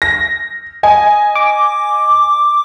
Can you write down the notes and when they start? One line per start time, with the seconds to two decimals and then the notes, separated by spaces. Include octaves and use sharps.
0.02 A#6
0.83 D#5 G#5
1.35 D6